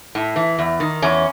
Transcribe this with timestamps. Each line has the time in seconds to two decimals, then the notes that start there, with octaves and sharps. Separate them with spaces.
0.15 A2
0.36 E3
0.59 E2
0.80 D#3
1.02 E2 C#4